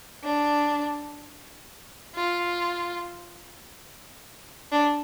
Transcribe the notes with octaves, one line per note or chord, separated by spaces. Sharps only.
D4
F4
D4